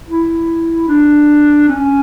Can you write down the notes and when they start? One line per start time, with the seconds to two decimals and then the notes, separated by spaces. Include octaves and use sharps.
0.08 E4
0.88 D4
1.68 C#4